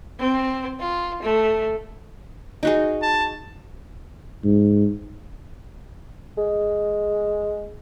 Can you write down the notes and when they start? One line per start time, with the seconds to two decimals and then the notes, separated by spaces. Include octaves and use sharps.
0.19 C4
0.80 F4
1.22 A3
2.63 D#4 F#4 G#4
3.02 A5
4.44 G#2
6.38 G#3